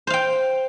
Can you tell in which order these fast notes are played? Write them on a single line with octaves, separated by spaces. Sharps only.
C5 F5 G5